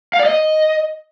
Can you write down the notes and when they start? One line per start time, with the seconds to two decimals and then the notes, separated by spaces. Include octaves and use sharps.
0.13 F5
0.20 D5
0.26 D#5